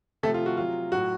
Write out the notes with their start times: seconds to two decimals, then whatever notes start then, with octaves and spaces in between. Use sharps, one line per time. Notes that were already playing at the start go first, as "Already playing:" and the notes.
0.23 C3 A3 A4
0.27 F3
0.34 F4
0.46 F#4
0.57 C3 F#3 F4
0.92 A2 F#3 F#4